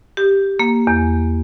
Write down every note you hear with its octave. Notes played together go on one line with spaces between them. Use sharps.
G4
A#3
E2